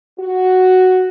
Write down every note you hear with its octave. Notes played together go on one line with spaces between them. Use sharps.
F#4